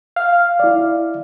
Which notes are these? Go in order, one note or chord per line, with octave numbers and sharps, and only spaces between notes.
F5
E4 D5